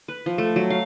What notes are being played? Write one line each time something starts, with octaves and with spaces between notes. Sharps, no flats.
B4
F3
A3
F#3
F5